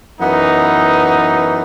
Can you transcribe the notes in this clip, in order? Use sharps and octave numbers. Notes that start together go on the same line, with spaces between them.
F#2 E3 B3 D#4